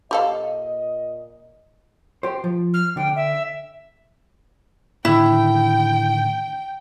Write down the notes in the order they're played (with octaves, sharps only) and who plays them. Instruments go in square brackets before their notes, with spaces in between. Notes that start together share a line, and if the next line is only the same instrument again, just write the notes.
[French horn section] A#2 D#5 [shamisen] G4 A4 F5
[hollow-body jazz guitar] G4 C5
F3
[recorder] F6
[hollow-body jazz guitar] D3 [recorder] G5
[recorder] E5
[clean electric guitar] A2 D3 D#3 [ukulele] E4 [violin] G5